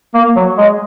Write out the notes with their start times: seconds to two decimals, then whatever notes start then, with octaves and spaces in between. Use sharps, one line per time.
0.15 A#3
0.36 F#3
0.58 G#3